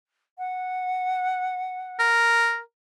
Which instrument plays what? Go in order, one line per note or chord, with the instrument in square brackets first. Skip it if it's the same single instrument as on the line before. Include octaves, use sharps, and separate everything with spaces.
[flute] F#5
[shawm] A#4